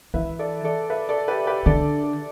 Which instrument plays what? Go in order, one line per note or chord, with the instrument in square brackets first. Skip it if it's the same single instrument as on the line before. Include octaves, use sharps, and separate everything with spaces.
[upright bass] E3 [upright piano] B4 E5
[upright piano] A4 D5
A4 D5
B4 E5
A4 D5
G4 B4
G4 B4
[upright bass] D3 [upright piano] A4 D5
[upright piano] A4